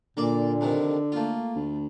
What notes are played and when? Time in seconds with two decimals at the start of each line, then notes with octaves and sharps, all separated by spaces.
0.17 A#2 D3 A#3 D5
0.61 F2 C3 D#3
1.12 A3 A#3 F4
1.56 D2